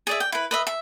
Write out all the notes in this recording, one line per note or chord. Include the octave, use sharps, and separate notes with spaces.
G#4 D5 E5
G5
E4 B4
B4 D#5 E5
E5